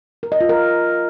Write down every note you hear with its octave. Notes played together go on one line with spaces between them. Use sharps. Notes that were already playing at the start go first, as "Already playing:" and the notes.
A#4
D#5
F4
A#4